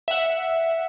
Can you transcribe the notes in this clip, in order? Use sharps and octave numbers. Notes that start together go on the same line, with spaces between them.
E5 F#5